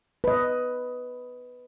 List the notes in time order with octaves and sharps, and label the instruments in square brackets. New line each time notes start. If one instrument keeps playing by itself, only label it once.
[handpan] B4 D#5